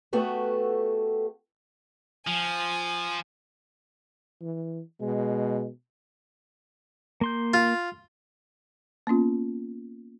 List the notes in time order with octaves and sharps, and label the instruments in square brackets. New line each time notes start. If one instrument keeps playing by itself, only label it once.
[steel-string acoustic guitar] A3 B3 F#4 G4 A4
[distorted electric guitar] F3 [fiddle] G#5
[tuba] E3
[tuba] B2 [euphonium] G#3
[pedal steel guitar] A#3 C6 G6
[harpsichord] F4
[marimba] A#3 B3 C#4 F4